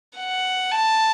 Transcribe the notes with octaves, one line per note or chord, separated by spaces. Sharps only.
F#5
A5